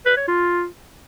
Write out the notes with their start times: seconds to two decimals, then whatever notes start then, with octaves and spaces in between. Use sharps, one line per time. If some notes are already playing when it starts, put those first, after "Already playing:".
0.06 B4
0.17 C#5
0.28 F4